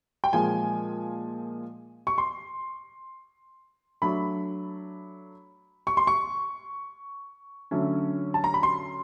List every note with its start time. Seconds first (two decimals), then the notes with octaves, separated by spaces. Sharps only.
0.24 G5
0.33 A#2 F3 G#3 G#5
2.07 C#6
2.18 C6
4.02 F#3 A3 D4 B5
5.87 C#6
5.97 C6
6.07 C#6
7.71 D3 F#3 A3 C#4
8.34 A5
8.44 A#5
8.54 B5
8.63 C6